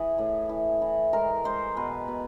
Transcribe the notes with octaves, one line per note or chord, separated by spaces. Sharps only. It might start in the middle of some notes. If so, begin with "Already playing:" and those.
Already playing: E3 G#4
A2
E3
E3
G#3 A#4
G#3 C5
B2 B4
B2